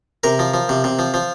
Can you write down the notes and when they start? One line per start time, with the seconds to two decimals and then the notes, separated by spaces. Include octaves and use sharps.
0.24 C3 A#4
0.39 F3
0.54 F3
0.69 C3
0.84 C3
0.99 F3
1.14 F3